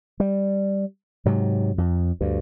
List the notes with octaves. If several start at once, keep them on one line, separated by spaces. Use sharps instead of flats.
G3
G#2 C3 F#3
F2
D2 G2